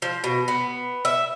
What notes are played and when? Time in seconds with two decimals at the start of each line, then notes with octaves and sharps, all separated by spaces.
0.02 F3
0.24 B2
0.48 B3
1.05 E5